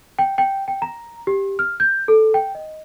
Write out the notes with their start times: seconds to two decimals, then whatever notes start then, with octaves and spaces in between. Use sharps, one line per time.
0.19 G5
0.38 G5
0.68 G5
0.82 A#5
1.27 G4
1.59 F6
1.80 G6
2.08 A4
2.34 G5
2.55 D#5